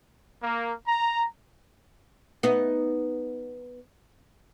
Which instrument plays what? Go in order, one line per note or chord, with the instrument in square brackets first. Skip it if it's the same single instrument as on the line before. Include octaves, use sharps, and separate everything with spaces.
[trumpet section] A#3
A#5
[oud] B3 D#4